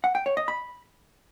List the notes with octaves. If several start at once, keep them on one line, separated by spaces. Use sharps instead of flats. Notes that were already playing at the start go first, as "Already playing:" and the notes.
F#5
G5
C#5
D#5
B5